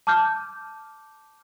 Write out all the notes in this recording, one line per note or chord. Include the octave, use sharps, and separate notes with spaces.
A5 D6 F6 G6